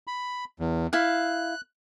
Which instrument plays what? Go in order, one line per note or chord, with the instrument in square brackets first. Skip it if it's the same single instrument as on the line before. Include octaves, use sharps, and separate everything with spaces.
[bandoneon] B5
E2
[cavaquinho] E4 F5 [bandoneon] F#6